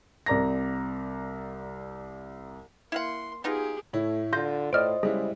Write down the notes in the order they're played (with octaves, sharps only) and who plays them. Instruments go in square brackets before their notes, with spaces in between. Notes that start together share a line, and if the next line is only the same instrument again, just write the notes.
[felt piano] C2 D5 A#5 A#6
[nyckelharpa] A#3 C6 [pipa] E4 F5 F#5
[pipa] B3 D#4 F4 [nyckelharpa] G4 G#4
[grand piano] A2 E4 C#5 [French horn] A3
[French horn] D3 [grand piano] F4 [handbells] C6 G6 A#6
[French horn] A2 [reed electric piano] C5 D#5 [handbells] D5 F6 D7
[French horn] C#3 [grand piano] G3 G#3 E4 [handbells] G#4